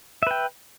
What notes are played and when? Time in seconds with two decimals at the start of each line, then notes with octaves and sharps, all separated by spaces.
0.23 E5
0.27 B4
0.31 G5